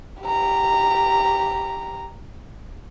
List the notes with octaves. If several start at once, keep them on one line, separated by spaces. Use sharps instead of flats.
G4 A#5